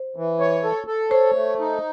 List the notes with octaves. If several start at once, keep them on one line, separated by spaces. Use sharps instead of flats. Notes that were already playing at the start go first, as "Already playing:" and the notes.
Already playing: C5
E3
C#5
A4
A4
C5 C#5
A3
D#4